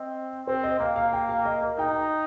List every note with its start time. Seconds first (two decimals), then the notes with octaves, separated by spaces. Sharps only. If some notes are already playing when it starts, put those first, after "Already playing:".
Already playing: C4 D#5
0.47 C4 C5
0.63 D#5
0.80 A#3 F5
0.96 F5
1.13 G5
1.29 F5
1.45 D#5
1.62 A#4
1.78 D#4 G5
1.88 A#5
1.98 G5